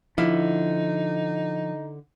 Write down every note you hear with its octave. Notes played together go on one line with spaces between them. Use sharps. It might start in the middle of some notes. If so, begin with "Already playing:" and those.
D3 F3 D#4 E4 F5